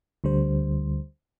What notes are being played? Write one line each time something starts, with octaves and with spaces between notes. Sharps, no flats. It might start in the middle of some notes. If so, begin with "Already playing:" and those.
D2 D3 G3 C5